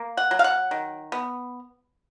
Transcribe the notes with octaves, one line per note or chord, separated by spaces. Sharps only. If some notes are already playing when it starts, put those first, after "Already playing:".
Already playing: A#3
F#5
F#3
F5
F#5
D#3
B3